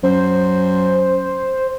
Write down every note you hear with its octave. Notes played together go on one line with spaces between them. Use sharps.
F#2 C5